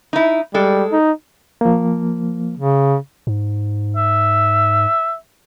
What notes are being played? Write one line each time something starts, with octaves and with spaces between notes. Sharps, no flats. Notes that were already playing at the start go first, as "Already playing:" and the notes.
D#4 E4
G3 G#3 A4
D#4
F3 A#3
C#3
G#2
E5